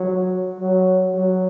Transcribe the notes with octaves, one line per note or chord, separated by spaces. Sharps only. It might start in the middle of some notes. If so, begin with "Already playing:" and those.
Already playing: F#3
F#3
F#3